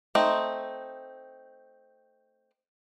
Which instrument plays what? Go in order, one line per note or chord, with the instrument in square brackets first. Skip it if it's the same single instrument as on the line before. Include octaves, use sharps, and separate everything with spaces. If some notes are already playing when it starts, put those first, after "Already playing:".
[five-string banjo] A3 C4 D#4